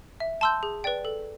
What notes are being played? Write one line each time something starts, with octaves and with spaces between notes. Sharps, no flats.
E5
A5 C6 E6 G6
G#4
B4 D5 G5
A4